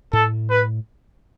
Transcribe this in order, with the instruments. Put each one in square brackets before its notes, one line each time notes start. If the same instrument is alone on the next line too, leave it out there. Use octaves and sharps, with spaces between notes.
[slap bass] A2 [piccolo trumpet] A4
[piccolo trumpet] B4